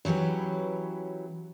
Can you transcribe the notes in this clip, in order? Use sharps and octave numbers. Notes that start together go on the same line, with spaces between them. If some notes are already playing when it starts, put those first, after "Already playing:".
E3 F#3 C#4 G4 B4